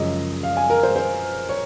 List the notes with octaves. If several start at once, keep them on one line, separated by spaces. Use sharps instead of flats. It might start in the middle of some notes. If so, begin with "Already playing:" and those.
Already playing: F#2 C#3 F3 G#3 D#5
F5
G#5
A#4
C5
C5
C#5